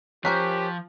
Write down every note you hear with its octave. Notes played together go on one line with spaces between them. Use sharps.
F3 C#4 G4 A#4 C5 C#6 F#6 B6